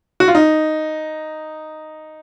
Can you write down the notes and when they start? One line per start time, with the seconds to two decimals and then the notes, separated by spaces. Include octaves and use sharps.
0.20 F#4
0.28 F4
0.35 D#4